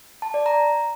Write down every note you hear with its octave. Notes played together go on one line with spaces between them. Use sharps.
A5
D5
A#5